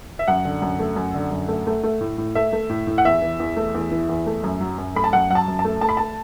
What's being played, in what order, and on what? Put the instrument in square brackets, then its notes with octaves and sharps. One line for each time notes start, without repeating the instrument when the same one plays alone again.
[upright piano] E5
F#2 F#5
D3
F#2
A3
F#2
D3
F#2
A3
A3
A3
A2
A2
A3 E5
A3
A2
A2
F#5
E2 E5
E3
E2
A3
E2
E3
E2
A3
F#2
F#3
F#2
A3 B5
A5
F#2 F#5
F#3 F#5
A5
F#2
A5
A3
A3 A5
B5
A3 A5